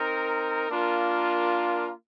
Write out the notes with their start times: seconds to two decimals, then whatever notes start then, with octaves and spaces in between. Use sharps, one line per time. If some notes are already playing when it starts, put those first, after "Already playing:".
Already playing: C4 D#4 A#4
0.69 A#3 D4 F4 A#4